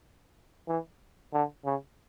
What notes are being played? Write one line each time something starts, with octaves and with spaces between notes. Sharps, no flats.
E3
D3
C#3